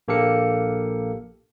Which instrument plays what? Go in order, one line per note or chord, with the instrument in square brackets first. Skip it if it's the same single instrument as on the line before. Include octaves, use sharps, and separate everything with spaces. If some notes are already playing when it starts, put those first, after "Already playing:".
[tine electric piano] A#1 A#3 G4 A4 F5 C#7